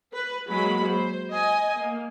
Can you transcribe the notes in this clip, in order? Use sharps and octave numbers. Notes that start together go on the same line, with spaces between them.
B4
F#3 G#3 A#3 F#4 B5
C5
D#5 G#5
A#3